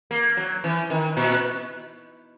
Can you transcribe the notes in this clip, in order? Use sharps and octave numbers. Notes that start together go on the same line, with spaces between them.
A#3
F#3
E3
D#3
A#2